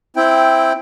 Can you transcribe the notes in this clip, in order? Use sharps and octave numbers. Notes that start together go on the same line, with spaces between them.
C4 E4 G5